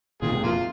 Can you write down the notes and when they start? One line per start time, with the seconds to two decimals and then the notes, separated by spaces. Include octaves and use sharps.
0.22 A#2 D#3 F4 G#4
0.32 G#2 C3
0.43 F2 A#2 A#3 F4